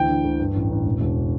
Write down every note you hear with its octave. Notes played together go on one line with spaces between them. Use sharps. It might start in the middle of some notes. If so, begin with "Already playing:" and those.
Already playing: D2 E3 G5
D3
D2
G2
A1
A1
E1
E1